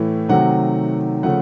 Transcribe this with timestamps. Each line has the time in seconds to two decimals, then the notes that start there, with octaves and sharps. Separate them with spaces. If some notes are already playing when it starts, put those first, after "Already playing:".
Already playing: A2 E3 A3
0.29 C3 D#3 F#3 A3 F#5
1.23 C#3 F3 A3 F#5